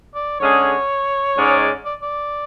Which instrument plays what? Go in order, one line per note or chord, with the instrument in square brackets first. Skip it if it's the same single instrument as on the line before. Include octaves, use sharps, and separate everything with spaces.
[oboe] D5
[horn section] D3 G#3 C#4 G#4 [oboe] C#5
[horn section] G#2 G#3 C#4 G#4 D5
[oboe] D5
D5